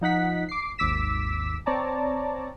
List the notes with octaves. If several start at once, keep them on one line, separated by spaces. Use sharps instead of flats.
F3 D#4 F#5 B6
D6 C7
G#1 D#2 D6 E6 B6 E7
C4 C#5 D5 A5 A#5